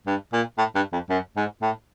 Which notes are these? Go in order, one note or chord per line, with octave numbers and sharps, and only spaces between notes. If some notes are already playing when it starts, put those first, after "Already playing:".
G2
A#2
A2
G2
F2
F#2
G#2
A2